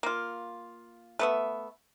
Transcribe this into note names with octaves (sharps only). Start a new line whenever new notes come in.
A#3 F4
A3 B3 E5